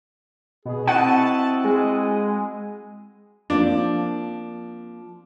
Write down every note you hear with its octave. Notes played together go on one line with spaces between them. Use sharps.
B2 G#4
C4 E4 F#4 D#5 F#5 A5
G#3
F3 A#3 C4 D4